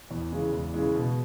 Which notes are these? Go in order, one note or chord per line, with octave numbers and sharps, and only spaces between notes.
E2
C#3 E3 G#3
E2
C#3 E3 G#3
B2